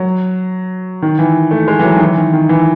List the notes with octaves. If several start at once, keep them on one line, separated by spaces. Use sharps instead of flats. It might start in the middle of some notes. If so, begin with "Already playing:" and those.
Already playing: F#3
D#3
E3
A3
G#3
E3
F#3
D#3
E3
D#3
D#3
E3